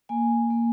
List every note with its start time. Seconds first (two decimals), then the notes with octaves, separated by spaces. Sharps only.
0.09 A#3 G#5
0.50 A#3